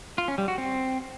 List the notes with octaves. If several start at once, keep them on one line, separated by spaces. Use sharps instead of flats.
F4
C#4
G3
F#4
C4